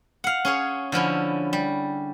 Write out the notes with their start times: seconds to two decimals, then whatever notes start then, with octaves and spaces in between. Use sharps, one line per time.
0.24 F5 F#5
0.45 C#4 G#4 C#5
0.92 D3 F3 C#4 E4
1.53 G3